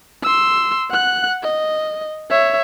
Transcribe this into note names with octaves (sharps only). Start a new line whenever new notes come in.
C6 E6
F#5 F#6
D#5
C#5 E5